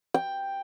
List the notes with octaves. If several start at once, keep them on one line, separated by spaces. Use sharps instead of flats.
G5